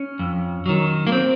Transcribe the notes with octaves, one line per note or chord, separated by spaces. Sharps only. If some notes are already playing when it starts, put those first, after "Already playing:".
Already playing: C#4
F2
D#3 F#3
A#3
C4